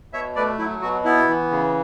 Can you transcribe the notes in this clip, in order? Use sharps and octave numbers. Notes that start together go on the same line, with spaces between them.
B2 C#5 E5
A3 B4 D5
F#3 E4
B2 F#4
B3 E4
E3
C#3